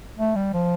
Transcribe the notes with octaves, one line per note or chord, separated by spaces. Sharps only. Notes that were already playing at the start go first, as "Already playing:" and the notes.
A3
G3
F3